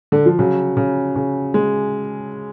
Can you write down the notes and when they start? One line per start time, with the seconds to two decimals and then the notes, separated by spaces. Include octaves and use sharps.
0.12 D3
0.26 F3
0.39 C#3 F#3
0.77 C#3
1.16 C#3
1.54 G#3